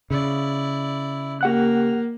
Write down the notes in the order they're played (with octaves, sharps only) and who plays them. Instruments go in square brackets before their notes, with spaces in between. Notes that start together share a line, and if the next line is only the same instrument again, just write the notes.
[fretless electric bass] C#3 [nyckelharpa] E4 D5
[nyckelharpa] A#3 [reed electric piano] G4 F#5 F#6